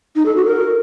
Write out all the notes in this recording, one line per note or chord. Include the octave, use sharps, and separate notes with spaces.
D#4
A4
F#4
A#4